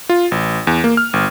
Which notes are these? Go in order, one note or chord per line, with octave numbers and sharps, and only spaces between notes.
F4
A1
E2
A#3
F6
G1